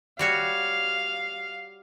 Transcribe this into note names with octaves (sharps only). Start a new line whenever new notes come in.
G3 F#4 C#5 F5